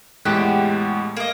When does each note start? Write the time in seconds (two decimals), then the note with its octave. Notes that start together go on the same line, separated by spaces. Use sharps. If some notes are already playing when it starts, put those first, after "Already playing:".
0.25 E2 A2 G#3 F#4 G4 F#6
1.17 A#3 D#5